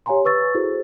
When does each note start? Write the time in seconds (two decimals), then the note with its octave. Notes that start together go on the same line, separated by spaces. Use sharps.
0.06 G4 C#5 F5 G#5 A#5 C6
0.25 B4 C#6 E6 A6
0.55 E4 F#4 G#4 A4 C5